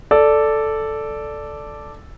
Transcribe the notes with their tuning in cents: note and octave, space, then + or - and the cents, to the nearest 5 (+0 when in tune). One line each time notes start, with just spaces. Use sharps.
A4 +0 D5 +0